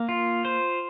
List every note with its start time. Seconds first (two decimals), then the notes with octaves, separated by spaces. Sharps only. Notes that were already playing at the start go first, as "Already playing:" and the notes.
Already playing: A#3
0.09 F4
0.45 C5